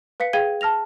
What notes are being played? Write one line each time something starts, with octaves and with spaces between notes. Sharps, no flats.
B4 F5 B6 C#7
G#4 F5 G5 G#6 D#7 G7
A5 F6 A#6 F7